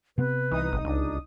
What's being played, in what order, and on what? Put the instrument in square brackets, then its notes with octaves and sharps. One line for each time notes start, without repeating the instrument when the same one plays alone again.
[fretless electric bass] C3 B3 C4 [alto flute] B4
[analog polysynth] C2 D#4 D#6 [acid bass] E3
[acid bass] G#1
[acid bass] C#2 [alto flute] D4